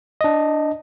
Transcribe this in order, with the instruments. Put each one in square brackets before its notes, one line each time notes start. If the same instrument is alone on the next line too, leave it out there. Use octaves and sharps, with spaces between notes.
[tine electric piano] D4 D#5